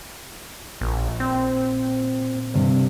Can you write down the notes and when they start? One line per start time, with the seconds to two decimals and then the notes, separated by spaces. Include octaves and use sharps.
0.81 A#1 A#2
1.20 C4
2.54 G2 C3